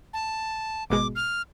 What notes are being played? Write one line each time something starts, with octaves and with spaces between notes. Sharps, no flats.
A5
G#1 B2 G#3 D6
F6